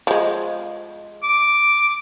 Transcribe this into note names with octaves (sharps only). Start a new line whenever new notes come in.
F3 G#3
D6